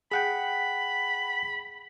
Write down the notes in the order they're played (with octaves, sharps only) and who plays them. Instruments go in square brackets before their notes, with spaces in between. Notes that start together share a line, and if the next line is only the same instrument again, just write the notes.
[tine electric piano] G#4 F#5 G5 [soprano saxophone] B5